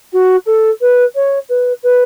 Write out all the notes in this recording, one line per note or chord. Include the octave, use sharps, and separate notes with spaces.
F#4
A4
B4
C#5
B4
B4